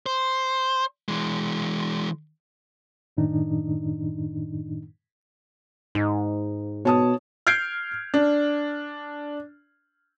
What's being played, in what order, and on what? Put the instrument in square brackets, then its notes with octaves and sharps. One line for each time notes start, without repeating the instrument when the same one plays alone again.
[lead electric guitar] C5
E3 G#3
[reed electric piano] F#2 A2 D#3 D4 D#4
[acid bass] G#2 [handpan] D#4
[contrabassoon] B2 [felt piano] C#5 A5 D#6
[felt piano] F6 G6 G#6 C7 D7
D4